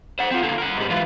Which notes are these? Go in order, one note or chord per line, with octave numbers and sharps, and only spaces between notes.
C5 F#5
C4 F4
D3 A#3
A#4 F#5
G#2 G3
E3 F4